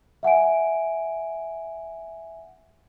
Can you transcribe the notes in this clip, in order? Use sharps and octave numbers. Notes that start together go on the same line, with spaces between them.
E5 F#5 G#5 D7